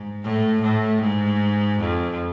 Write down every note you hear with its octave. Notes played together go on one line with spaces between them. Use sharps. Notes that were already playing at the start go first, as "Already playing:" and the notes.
Already playing: G#2
A2
A2
G#2
F2